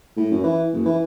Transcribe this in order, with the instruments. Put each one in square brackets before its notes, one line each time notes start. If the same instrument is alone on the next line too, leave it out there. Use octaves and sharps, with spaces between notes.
[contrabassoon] A2
F#2
E3
F#1
E3